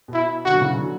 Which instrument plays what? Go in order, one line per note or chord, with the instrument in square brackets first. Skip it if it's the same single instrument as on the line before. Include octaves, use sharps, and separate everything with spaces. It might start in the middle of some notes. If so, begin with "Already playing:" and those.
[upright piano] B2
[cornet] E4
[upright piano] B2 D3 [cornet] F#4
[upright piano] F#3
C#3 E3
D3 F#3